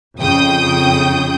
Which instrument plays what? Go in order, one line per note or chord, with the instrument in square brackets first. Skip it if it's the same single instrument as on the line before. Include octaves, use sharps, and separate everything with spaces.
[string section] F2 C#3 F3 G5 D#6 G6